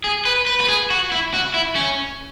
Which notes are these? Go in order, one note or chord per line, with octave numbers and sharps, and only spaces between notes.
G#4
B4
B4
B4
G#4
F#4
E4
F#4
E4
C#4